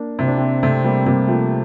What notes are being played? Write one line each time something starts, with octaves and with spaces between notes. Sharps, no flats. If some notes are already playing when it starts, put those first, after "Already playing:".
Already playing: A#3 D4
C3 E4
D4
C4 E4
C3 A3 C4
G3 A#3
C3 G3 A#3
F3 A3